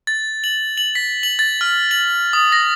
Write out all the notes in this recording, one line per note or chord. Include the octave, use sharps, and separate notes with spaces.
A6
F#7
F#7
B6
F#7
A6
F6
F#7
D#6
A#6